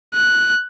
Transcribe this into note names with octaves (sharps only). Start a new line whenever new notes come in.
F#6